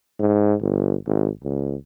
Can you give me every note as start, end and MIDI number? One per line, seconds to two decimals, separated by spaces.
0.20 0.54 44
0.62 0.96 31
1.06 1.29 32
1.43 1.75 37